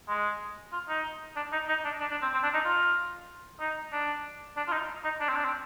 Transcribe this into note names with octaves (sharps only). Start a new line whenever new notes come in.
G#3
F4
D#4
D4
D#4
D#4
D4
D4
D4
C4
C4
D4
D#4
F4
D#4
D4
D4
F4
D#4
D#4
D4
C4
D4
C4